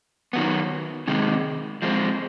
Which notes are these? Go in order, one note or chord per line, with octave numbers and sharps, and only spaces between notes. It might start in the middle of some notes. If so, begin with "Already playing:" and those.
D#3 F#3 B3
C3 D#3 G#3
F3 G#3 C4